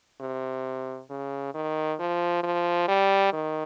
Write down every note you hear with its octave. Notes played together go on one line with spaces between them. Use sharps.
C3
C#3
D#3
F3
F3
G3
D#3